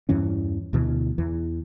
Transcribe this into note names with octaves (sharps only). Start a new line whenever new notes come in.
E2 G2 E3 C#4
D2 B2 E3
E2 E3